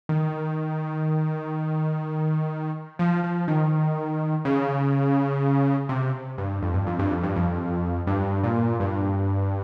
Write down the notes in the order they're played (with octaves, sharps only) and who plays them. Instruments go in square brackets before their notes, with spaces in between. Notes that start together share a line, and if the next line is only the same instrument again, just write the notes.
[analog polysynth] D#3
F3
F3
D#3
C#3
C3
G2
F2
G2
F2
G2
F2
G2
F2
G2
A#2
G2